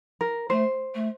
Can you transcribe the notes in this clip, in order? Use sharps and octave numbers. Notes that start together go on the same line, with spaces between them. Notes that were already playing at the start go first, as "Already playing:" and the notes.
A#4
A3 C5
A3